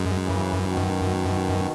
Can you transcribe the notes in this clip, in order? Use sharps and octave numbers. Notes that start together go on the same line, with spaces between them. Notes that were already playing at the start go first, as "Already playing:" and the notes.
Already playing: F#2 G#3
C#3 E3
C#3
B2 D#3